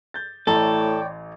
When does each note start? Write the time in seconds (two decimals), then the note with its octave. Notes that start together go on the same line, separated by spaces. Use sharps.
0.14 G6 A6
0.47 A1 A2 A4 C#5 D5 G5 A#5 A6